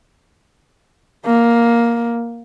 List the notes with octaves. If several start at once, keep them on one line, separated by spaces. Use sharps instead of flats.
A#3